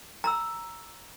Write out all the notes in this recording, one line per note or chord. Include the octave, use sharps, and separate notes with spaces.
A#5 B5 E6